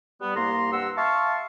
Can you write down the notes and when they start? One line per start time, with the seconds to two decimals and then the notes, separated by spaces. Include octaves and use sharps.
0.21 G3 B3
0.36 C2 A#3 A#5 C6
0.72 G2 F#5 E6
0.97 E5 F5 A5 C6 C#6